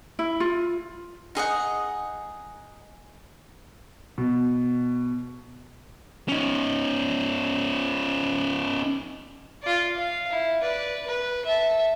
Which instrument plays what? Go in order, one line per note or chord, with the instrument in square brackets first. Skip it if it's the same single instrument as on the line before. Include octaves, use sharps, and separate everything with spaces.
[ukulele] E4
F4
[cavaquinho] D#4 G#4 D#5 F#5
[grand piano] B2
[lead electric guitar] C#4 D#4
[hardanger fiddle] F4 D5
F5
E4
B4 D5
B4
E5 A5